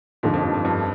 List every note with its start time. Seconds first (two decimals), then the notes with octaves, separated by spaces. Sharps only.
0.23 D#2 G#2 D3 F3
0.34 F2
0.43 G2
0.54 F2
0.65 G2